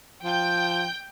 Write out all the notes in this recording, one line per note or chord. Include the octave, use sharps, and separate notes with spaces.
F3 G5 G6